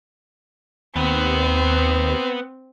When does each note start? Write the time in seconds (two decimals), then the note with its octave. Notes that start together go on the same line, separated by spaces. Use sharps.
0.96 D#2 B3 C4